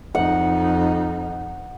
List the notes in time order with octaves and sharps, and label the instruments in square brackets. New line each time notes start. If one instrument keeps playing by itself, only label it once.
[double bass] F2 D#4 [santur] F#5